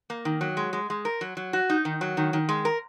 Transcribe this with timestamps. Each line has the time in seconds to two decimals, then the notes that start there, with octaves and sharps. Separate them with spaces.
0.10 A#3
0.25 D#3
0.41 F#3
0.57 G#3
0.73 G#3
0.90 G#3
1.05 A#4
1.21 F#3
1.37 F#3
1.53 F#4
1.70 D#4
1.85 D#3
2.01 F#3
2.17 D#3
2.33 D#3
2.49 G#3
2.65 A#4